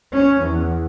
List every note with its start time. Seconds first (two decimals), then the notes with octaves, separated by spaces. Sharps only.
0.12 C#4
0.41 E2